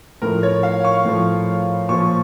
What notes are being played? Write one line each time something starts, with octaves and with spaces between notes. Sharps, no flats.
A2 F3 A#4
C#5
F5
C#6
A2 F3
A#2 F3 C#6